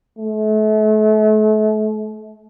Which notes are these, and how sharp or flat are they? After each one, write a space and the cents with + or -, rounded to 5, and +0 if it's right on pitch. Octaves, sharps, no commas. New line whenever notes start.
A3 -35